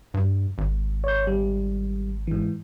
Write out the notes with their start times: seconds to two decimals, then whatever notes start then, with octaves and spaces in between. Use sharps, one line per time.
0.14 G2
0.58 G#1
1.04 C#5 G6
1.27 G3
2.27 G#2 E3